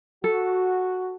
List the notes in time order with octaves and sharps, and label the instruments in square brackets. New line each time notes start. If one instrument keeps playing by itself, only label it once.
[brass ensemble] F#4 [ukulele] A4